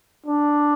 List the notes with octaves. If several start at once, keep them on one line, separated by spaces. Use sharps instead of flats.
D4